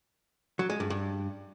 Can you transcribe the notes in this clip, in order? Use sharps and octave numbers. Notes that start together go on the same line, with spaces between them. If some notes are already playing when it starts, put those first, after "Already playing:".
F#3
G#3
G2
G2